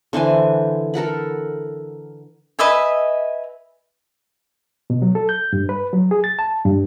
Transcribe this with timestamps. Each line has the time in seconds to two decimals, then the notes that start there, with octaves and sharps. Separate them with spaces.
0.13 D3 E3 C5 G#5
0.94 A4 A#4 F#5 B5
2.59 B4 D#5 E5 G#5
4.90 B2
5.02 F#3
5.15 A4
5.29 G6
5.53 G2
5.69 B4
5.93 F#3
6.11 G#4
6.24 A6
6.39 A5
6.64 G2